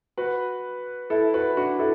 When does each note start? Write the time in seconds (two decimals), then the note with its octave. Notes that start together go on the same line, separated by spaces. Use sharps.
0.17 F#4 B4
1.10 E4 A4
1.34 F#4 B4
1.57 D4 F#4
1.79 E4 A4